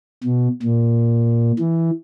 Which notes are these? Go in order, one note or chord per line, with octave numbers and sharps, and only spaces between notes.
B2
A#2
E3